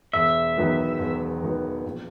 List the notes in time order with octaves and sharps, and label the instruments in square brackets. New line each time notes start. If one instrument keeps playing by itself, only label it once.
[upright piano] E1 [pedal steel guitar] E5
[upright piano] E2 D#3 F#3 B3
E1
E2 D#3 F#3 B3
A#1